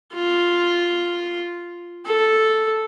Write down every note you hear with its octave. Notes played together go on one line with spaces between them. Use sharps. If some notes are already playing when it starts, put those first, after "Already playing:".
F4
A4